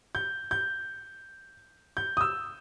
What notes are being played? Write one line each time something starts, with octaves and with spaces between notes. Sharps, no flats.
G6
G6
G6
D#6
E6